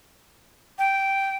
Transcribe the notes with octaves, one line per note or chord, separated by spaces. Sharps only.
G5